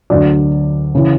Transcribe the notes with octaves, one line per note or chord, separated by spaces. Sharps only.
D2 D3 F#3 D5
C#3 E3